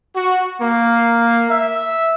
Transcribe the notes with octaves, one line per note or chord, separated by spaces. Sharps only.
F#4
A#3
E5